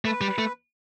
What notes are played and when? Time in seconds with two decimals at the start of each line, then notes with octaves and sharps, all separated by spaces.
0.05 A3 B4
0.21 G3
0.39 A3